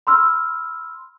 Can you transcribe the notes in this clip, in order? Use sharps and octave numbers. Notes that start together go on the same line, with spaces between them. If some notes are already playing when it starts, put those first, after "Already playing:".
B5 C6 E6 F6